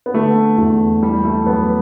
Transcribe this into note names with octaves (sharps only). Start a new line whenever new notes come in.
B3
D3 A3
E2 A3
E3 G3
A3
F#2 B3